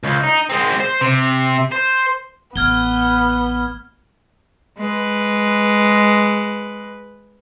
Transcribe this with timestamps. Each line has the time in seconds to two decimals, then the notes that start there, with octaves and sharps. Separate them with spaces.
0.03 C#2
0.23 D#4
0.50 G#3 C4
0.80 C5
1.01 C3
1.72 C5
2.56 A1 B3 F6 G#6 G7
4.77 G#3 B4